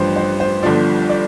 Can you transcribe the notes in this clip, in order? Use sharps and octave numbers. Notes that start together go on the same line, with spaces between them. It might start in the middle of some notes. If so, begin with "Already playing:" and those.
Already playing: A1 G2 F3 B4 C5
C5
C5
G1 G2 D3 F3 D5
D5